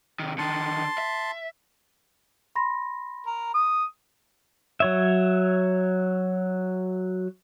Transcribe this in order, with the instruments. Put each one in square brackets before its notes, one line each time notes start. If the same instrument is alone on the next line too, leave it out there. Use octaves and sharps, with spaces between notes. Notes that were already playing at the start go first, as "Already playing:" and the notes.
[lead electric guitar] C3 D#3
[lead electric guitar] D3 D#3 [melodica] A5 C6
[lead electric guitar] E5
[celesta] B5 C6 A#6
[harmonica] A#4
D#6
[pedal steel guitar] F#3 C#5 E5